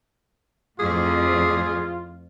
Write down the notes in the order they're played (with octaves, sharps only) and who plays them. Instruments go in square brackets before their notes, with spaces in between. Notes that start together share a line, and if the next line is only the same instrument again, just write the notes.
[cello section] F2 A2 [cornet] F4 [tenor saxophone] G#4